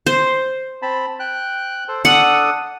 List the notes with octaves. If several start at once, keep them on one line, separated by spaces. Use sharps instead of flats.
C5
C4 A5 B5
G5 F#6
A4 C5
D4 A4 F#5 D#6